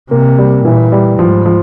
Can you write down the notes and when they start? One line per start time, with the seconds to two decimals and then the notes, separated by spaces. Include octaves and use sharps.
0.11 C3 A#3
0.38 G3
0.64 A#2 E3
0.92 G3
1.19 G#2 F3
1.46 F3